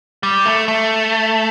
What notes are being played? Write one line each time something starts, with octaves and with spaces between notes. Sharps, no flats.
G3
A3
A3